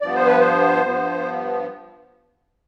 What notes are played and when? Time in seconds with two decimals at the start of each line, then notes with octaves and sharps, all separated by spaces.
0.02 G2 F3 B3 D5
0.15 C5
0.27 B4
0.39 C5
0.86 G2 F3 B3